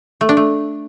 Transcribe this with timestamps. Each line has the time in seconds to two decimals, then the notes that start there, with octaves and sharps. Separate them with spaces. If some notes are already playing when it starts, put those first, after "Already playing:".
0.21 A3
0.29 D4
0.37 A3